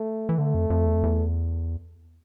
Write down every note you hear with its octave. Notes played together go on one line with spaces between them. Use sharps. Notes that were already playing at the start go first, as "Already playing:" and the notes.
Already playing: A3
E3
D3 A3
F2
F2
E2
F2
E2